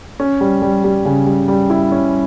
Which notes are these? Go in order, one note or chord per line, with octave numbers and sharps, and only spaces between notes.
C#4
G3
G3
G3
C#3
G3
G3
E4
C#4